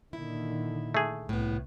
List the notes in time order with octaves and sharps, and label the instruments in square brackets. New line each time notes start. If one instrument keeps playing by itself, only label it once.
[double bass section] A#2 D3 D#3 [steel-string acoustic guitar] E4
[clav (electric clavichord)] A3 G#4
[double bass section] C2 [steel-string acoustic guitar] A2 B3